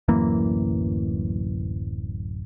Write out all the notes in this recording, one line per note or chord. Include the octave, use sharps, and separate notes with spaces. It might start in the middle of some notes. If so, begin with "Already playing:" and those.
D1 F#2 E3 A#3